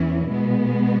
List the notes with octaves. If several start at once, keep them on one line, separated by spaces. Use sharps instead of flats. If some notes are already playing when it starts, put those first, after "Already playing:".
Already playing: E2 E3 C#4 E4
B2 G#3 B3